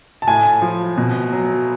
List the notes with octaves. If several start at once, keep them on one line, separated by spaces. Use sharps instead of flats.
A5
A2 G#5
F3
B2
F#3